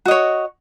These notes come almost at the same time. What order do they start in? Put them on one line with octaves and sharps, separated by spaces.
F#4 D#5 C#5